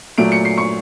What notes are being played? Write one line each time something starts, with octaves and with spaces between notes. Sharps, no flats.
A#2 F#3 A3 D7
C#7
C7
C#6 C#7